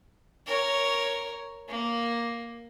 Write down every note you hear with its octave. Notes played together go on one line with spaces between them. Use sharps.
A#4 C#5
A#3